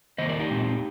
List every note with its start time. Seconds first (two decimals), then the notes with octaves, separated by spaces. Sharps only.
0.18 D#3 A#3 C5 D#5
0.29 A#4 D5
0.39 D#4 G4
0.50 A#2 G#3 C4